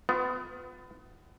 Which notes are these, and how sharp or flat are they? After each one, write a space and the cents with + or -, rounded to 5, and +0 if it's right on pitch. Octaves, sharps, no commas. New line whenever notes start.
B3 +30 F4 +20